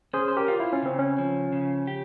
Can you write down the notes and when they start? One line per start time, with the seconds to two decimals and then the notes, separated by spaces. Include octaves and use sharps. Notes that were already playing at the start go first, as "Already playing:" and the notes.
0.13 C#4 G#4 C5
0.28 C5
0.37 G4 A#4
0.48 F4
0.60 E4
0.73 C#4
0.82 C#3 C4
0.99 C#4
1.18 F3
1.53 C#3
1.87 G4